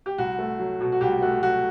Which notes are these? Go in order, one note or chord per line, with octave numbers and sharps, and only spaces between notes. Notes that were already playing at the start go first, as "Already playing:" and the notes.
G4
C2 F#4
A3
F#3
B2
F#4
C2 G4
A3 F#4
F#3 F#4